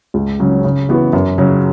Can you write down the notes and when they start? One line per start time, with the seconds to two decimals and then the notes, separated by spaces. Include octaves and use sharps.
0.14 C#2
0.40 C#3 F#3 C#4
0.64 C#3
0.89 E3 B3 F#4
1.13 F#2
1.38 C#3 F#3